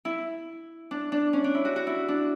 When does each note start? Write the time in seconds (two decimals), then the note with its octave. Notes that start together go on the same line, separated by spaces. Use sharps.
0.05 E4
0.91 D4
1.12 D4
1.33 C#4
1.44 D4
1.55 E4
1.65 F#4
1.76 F#4
1.87 E4
2.08 D4